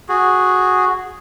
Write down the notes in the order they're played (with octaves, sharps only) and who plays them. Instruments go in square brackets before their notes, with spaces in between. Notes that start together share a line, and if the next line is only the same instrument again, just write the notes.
[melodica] F#4 G#4